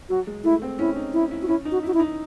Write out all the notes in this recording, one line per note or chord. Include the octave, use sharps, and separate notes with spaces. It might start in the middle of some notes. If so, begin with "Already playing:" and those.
F#3 F#4
G#3
A3 E4
C4
C#4 E4
D#4
E4
E4
F#4
C#4 E4
D#4
F#4
E4
F#4
E4
D#4